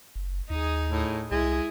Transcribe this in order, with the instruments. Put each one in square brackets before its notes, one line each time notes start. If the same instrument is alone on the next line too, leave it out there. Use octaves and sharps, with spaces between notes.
[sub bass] F#1
[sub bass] D#2 [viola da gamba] D#4 G#4
[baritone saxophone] A2
[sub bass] C2 [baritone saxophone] G#3 [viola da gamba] E4 G#4